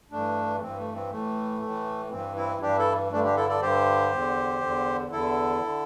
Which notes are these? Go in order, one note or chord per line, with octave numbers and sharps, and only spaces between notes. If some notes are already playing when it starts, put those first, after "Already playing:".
G2 E3 A3 D4
A3
G2 E3 C4
A3
C4
A2 E3 A3
A2 E3
G2 E3 C4
C4 E4
G2 E3 D4 G4
E4 A4
G2 D3 A3 D4
D4 G4
E4 A4
A4 D5
G2 D3 G4 C5
E2 D3
E2 D3
E2 D3 E4 A4
D3